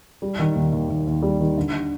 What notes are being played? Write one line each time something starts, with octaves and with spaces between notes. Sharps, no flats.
G3
D#3
D#2
D#2
D#2
D#2
G3
D#3
D3